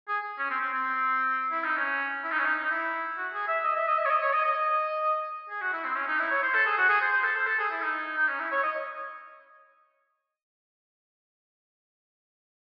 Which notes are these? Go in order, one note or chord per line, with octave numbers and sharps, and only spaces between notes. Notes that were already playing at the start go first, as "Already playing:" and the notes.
G#4
C#4
C4
C4
C4
E4
D#4
C#4
E4
D#4
C#4
D#4
D#4
E4
F#4
G#4
E5
D#5
E5
D#5
E5
C#5
D#5
C#5
D#5
D#5
G#4
F#4
E4
C4
C#4
D#4
E4
C#5
C5
A4
G#4
F#4
G#4
C5
C5
A4
C5
A4
G#4
E4
D#4
D#4
C#4
E4
C#5
D#5